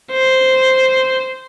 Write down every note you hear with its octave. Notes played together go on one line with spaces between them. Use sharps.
C5